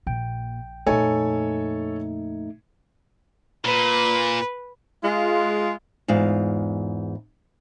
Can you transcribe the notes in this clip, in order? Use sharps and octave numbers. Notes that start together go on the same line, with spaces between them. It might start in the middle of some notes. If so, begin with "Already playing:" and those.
A#1 A#2 G5
F2 A#2 A3 D#4 A4 C#5 E5 G#5
A#2 B4
G#3 F4
E2 G#2 F4 F5